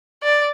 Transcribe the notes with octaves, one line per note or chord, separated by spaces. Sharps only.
D5